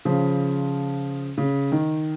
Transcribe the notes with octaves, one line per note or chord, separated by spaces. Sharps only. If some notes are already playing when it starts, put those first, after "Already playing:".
C#3 F3
C#3
D#3